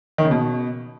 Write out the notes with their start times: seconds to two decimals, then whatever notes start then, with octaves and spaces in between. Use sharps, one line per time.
0.18 D#3
0.25 C#3
0.31 B2